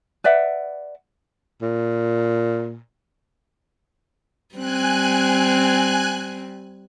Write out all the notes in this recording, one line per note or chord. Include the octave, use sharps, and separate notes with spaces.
B4 D5 E5 F#5
A#2
G3 C4 G#5 F#6